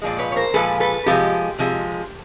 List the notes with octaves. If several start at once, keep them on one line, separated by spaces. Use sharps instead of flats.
A#2 F3 G#3 D5
B4 C#5
C#5
A#4 C5
A#2 F3 G#3 A4 B4
A4 B4
C3 F3 G#3 G4 A4
C3 F3 G#3